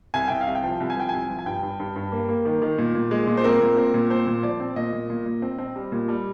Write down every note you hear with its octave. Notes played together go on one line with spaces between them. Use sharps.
C2 G#5
C2 G5
F5
C2
G5
F3
C2
G#5
F3 G5
C2 G#5
F3
G#5
G2 G5
G2
G2
G2
A#3
A#3
D#3
D#3
A#2
A#2
G#3
A#2
C5
C4 A#4
A#2
C4
A#2
C4 C5
A#2
F3 D5
C4
A#2 D#5
A#2
A#2
A#2
C4
C4
G3
A#2
G3